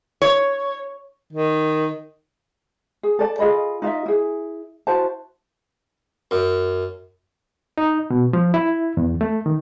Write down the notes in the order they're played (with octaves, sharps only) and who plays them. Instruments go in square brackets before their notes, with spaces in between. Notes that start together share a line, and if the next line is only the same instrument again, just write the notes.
[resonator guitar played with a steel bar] C#5
[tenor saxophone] D#3
[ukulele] G#4
A4 D5 A5
F4 G#4 D#5 B5
D#4 F4 D#5 E5
E4 G#4
E4 F#4 C5 A5
[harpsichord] F#2
[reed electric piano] D#4
B2
F3
E4
E2
A3
D#3